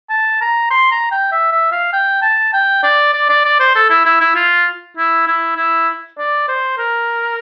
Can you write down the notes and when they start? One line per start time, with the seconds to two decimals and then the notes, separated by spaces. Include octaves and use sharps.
0.10 A5
0.41 A#5
0.71 C6
0.91 A#5
1.11 G5
1.32 E5
1.52 E5
1.72 F5
1.93 G5
2.22 A5
2.53 G5
2.83 D5
3.13 D5
3.29 D5
3.45 D5
3.60 C5
3.75 A4
3.90 E4
4.05 E4
4.20 E4
4.35 F4
4.97 E4
5.27 E4
5.57 E4
6.18 D5
6.48 C5
6.78 A#4